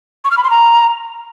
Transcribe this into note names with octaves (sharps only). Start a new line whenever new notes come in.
C#6
F6
B5
C6
A#5